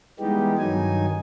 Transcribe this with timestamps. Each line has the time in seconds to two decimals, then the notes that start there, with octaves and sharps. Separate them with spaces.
0.19 E3 G3 G#3 B3 D#4 G4
0.58 G2 D#3 F#3 D#4 G#5